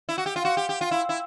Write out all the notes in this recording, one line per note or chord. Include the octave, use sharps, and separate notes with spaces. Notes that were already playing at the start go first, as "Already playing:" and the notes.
E4
F#4
G4
F4
F#4
G4
G4
F4
E4
E4